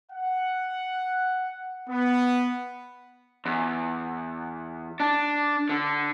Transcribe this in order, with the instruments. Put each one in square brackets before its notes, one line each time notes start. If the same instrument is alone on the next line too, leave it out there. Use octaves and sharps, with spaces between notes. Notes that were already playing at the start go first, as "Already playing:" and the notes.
[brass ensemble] F#5
B3
[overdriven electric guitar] E2
D4
D3